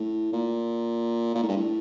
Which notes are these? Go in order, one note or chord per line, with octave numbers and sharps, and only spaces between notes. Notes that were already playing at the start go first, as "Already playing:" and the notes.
Already playing: A2
A#2
A#2
A2
G2
A2